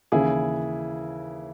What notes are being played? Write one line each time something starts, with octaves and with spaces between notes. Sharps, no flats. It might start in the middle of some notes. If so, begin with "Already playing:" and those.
D#2 C#3 E3 E4 G#4